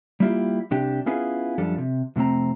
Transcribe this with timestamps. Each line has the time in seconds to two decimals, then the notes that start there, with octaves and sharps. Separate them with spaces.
0.20 G3 A#3 E4 F4 G4
0.71 C2 C3 D4 G4
1.06 B3 C#4 E4 F4 G#4 B4
1.58 F#2 F3 G3 D4 A4
1.78 C3
2.16 F2 C3 A3 C4 A#5